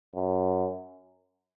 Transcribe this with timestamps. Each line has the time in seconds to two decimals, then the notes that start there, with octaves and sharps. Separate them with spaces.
0.15 F#2